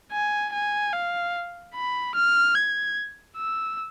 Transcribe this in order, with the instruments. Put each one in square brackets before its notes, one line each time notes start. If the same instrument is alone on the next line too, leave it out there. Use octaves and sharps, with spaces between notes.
[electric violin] G#5
G#5
F5
B5
F6
G#6
E6